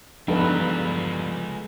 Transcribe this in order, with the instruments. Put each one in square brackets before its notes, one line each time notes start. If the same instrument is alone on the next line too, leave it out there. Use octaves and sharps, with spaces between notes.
[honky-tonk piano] E2 G2 [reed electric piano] F3 [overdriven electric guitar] G#3 F4 [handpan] D#4 A4 B4